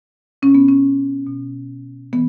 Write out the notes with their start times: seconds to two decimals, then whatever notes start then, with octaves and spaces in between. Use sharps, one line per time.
0.42 B2 C#4
0.55 B3
0.69 C#4
1.27 B2
2.13 E3 B3